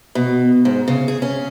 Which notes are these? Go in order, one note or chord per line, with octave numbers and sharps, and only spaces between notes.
B2
G#2
C#3
G#4
C#4